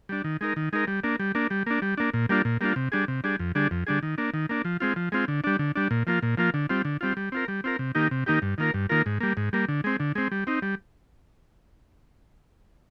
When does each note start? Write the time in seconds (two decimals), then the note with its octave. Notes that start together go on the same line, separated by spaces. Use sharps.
0.09 G3 D4
0.24 D#3
0.41 G#3 D#4 A#4
0.56 D#3
0.73 G#3 D#4 A#4
0.87 G3
1.04 A#3 D4
1.19 G3
1.35 A#3 D4
1.50 G3
1.66 A#3 D4
1.82 G3
1.97 A#3 D4
2.14 A#2
2.29 G3 A#3 D4 F4
2.45 A#2
2.61 G3 A#3 D4 F4
2.76 C3
2.92 G3 D4 G#4
3.08 C3
3.24 G3 D4 G#4
3.39 F2
3.55 D3 G3 D4 G#4
3.71 F2
3.87 D3 G3 D4 G#4
4.03 D#3
4.18 A#3 D4
4.34 D#3
4.49 A#3 D4
4.65 F3
4.80 G#3 C4 F4
4.96 F3
5.12 G#3 C4 F4
5.28 D3
5.44 G3 D4
5.59 D3
5.75 G3 D4
5.91 A#2
6.07 F3 A#3 F4
6.22 A#2
6.37 F3 A#3 F4
6.54 D3
6.69 G3 C4 F4
6.85 D3
7.01 G3 C4 F4
7.17 G3
7.32 C4 F4 A#4
7.48 G3
7.64 C4 F4 A#4
7.79 C3
7.95 D#3 A#3 D#4 G4
8.11 C3
8.26 D#3 A#3 D#4 G4
8.42 G2
8.58 D#3 A#3 F4 A#4
8.74 G2
8.89 D#3 A#3 F4 A#4
9.06 G#2
9.20 G3 A#3
9.37 G#2
9.53 G3 A#3
9.68 D3
9.84 G#3 C4
10.00 D3
10.15 G#3 C4
10.31 G3
10.47 C4 D#4
10.62 G3